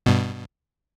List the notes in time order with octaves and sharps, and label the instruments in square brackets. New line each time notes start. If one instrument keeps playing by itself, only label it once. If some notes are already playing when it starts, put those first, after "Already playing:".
[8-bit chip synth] G2 B2